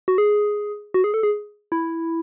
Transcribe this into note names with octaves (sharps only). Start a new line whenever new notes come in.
F#4
G#4
F#4
G#4
A4
G#4
E4